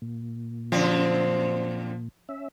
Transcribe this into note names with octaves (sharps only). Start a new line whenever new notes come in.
A#2
F#2 D3 F3 C4
C#4 E5